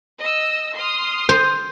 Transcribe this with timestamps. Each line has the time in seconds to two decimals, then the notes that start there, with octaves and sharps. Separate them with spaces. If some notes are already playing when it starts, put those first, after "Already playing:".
0.19 D#5 E6
0.75 C6 D#6 F6
1.29 C5